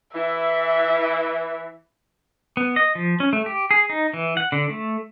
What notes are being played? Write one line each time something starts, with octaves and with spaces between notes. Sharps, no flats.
E3 E4 E5
B3
D#5
F3
C#4
A3
G4
G#4
D#4
E3
F#5
D3
A3